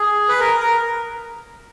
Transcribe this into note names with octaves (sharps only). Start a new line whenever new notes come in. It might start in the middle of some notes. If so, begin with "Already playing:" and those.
Already playing: G#4
B4
A#4
A#4